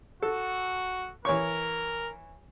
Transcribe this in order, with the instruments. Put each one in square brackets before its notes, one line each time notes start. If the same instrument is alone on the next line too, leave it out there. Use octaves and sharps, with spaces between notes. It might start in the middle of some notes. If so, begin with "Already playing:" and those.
[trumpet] F#4 [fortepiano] A4
[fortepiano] E3 C#5 C#6 [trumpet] A#4